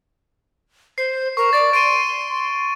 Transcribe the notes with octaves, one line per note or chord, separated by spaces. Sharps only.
C5 C7
A#4 C#6
D5 A6
C6 D7 D#7